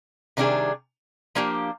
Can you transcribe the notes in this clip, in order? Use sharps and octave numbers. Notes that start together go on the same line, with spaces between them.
C3 D#3 G3 D4 G#4
F3 A#3 D4 G4